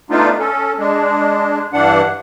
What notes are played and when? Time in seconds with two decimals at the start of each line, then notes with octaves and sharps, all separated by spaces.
0.10 A3 B3 D4 D#4 F4
0.39 C#4 A4
0.79 G#3 D4
1.73 G2 E3 D4 F#5